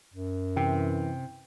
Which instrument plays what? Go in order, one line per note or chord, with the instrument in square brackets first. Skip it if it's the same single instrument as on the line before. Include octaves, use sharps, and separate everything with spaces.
[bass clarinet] F#2
[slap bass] C3 [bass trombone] E3 [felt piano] G5